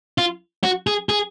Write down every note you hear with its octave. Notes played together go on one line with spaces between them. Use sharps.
F4
F#4
G#4
G#4